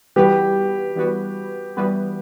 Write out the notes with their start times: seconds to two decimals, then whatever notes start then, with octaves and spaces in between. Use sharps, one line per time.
0.16 E3 G3 B3 F#4 G4 B4
0.96 E3 G3 B3 F#4 B4
1.77 E3 G3 B3 F#4 B4